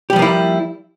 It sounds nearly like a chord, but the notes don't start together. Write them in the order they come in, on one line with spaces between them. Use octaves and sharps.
G4 G3 F3 A#3 E4